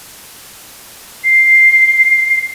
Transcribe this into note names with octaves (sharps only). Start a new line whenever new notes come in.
C7